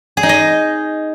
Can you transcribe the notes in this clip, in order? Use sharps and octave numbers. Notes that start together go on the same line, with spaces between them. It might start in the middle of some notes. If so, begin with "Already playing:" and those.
G#4
D#4
D#5